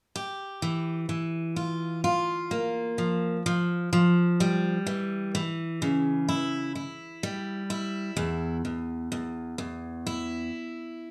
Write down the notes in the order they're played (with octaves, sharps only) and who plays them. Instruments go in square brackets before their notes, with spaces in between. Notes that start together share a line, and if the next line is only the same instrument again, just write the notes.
[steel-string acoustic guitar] G4
E3
E3
F4
F4
A#3
F3
F3
F3
G3
E3
E3
C#3
E4
E4
G3
E4
E2
E2
E2
E2
E4